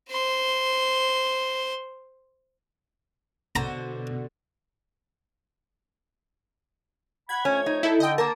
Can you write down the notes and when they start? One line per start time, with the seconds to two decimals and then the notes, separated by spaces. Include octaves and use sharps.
0.11 C5 C6
3.56 B2 D3 F#4 C5 A#5
7.29 F#5 B5 G#6
7.45 F2 A3 C#4 C#5
7.66 D#4
7.83 E4 A4
8.00 D3 D#5 G5
8.18 A#3 A#4 A5